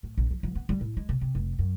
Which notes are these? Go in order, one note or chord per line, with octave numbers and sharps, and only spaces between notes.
A2
A#1
F3
F3
B3
G3
A2
G#3
C3
C3
F1
F#2